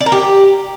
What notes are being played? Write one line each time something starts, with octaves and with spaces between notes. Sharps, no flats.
D5
A#4
G4